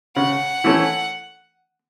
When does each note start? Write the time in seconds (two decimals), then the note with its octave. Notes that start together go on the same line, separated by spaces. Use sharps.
0.16 C#3 F#5
0.64 E3 A3 C#4